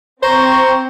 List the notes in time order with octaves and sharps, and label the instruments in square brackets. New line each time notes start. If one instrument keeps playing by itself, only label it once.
[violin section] C4 [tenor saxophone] C5 [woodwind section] A#5 C#6